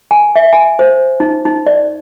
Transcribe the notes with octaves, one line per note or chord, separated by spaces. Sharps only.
G#5
E5
G#5
C5
D#4
D#4
D5